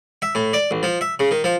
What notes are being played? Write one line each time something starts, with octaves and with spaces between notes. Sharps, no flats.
E5
A2
D5
A1
F3
E5
C#3
D#3
F3